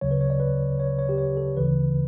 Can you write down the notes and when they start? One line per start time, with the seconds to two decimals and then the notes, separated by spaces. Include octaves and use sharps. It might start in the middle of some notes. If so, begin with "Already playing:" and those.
0.01 D2 C#3 F#3 C#5
0.11 B4
0.21 C#5
0.30 D5
0.40 B4
0.80 C#5
0.99 C#5
1.09 G4
1.18 C#5
1.37 A4
1.57 D2 C#3 E3 B4